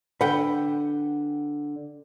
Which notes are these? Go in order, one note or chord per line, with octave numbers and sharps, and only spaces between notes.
D3 B4 F#5 G5